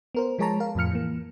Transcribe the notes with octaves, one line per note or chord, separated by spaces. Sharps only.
B3 A#4 C5
F3 G#3 G#4 C#5 A5 A#5
A#4 F5
F2 A2 F3 F6 C#7
E3 A#3